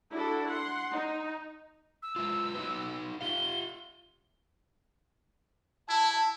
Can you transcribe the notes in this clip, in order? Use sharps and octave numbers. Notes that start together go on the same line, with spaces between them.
D4 E4 F#4 A4
F#5 C6
D#4
E6
G#3 E4 F4
D#4 F#4 B4
F4 G4 F5 G7
E4 A5